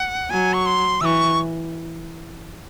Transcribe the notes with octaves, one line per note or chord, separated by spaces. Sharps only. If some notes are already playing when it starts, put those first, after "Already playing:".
Already playing: F#5
F#3 G#5
C#6
C6
E3 C#6 E6